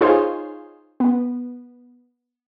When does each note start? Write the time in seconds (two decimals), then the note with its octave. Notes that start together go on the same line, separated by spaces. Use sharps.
0.01 D#4 F4 G#4 C5 C#5
1.00 B3